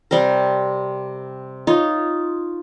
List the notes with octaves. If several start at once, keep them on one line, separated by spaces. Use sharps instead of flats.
C3 G3 C4 A#4
D#4 F4 C#5